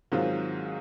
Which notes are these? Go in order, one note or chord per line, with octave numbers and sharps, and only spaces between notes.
G#2 D#3 F#3 C4 F4